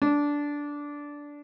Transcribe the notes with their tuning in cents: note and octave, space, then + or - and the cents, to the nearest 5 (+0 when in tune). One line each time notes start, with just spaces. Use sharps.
D4 -10